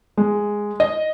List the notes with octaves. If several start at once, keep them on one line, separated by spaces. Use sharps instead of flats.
G#3
D#5